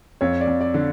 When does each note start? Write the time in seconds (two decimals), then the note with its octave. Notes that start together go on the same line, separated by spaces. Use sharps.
0.21 F2 C#5
0.41 D5
0.47 F2
0.61 D5
0.74 D3